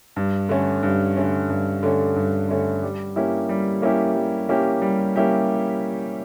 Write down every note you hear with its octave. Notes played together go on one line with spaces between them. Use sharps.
G2
D3 A3 C#4
G2
D3 A3 C#4
G2
D3 A3 C#4
G2
D3 A3 C#4
G3
A#3 C#4 E4 G4
G3
A#3 C#4 E4 G4
G3
A#3 C#4 E4 G4
G3
A#3 C#4 E4 G4